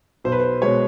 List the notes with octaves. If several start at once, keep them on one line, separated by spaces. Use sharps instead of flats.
B1 C5
B4
C5
B2 G#3 C#5